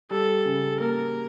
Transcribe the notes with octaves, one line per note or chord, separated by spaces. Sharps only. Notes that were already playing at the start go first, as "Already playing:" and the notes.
G3 A4
C#3
A#3 A#4